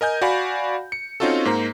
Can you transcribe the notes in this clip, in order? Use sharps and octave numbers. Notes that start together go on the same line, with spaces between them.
A#4 D#5 G#5 G6
F#4 D5 F5 F#5 G#5 B5
C#7
C4 C#4 D#4 F4 F#4 A4
G#2 A#3 C5 A#5